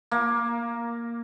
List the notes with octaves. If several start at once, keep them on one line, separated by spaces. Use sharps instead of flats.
A#3